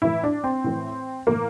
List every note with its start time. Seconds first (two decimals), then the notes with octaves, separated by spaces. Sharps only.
0.02 A2 E3 E4
0.24 D4
0.44 C4
0.64 A2 E3
1.27 A2 E3 A#3